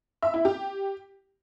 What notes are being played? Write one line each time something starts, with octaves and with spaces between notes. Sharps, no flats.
E5
E4
G4